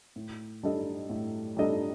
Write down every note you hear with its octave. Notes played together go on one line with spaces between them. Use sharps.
A2
G3 D4 A4 D#5
A2
G3 D4 A4 D#5